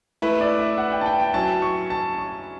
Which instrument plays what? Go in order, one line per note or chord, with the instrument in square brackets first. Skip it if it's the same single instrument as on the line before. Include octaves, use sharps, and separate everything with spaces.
[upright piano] A3 E4 B4 [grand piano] E5
[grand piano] D5
E5
F#5
G5
A5
G5
G5
[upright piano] F#3 C#4 E4 [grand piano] A5
[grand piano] C#6
A5
C#6